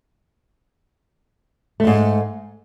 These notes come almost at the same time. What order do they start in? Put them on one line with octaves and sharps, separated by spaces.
A3 F2 G#2